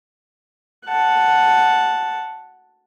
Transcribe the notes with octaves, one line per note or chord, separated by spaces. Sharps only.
F#5 A5